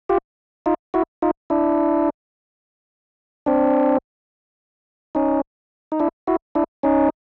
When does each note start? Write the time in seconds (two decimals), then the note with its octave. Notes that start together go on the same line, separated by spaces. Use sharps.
0.09 F4 G4
0.66 D#4 F4
0.94 E4 F#4
1.22 D#4 F4
1.50 D4 E4
3.46 C4 D4
5.15 C#4 D#4
5.92 D#4
6.00 D4 E4
6.27 E4 F#4
6.55 D4 E4
6.83 C#4 D#4